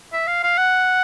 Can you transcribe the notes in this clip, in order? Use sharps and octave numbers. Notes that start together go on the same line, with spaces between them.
E5
F5
F5
F#5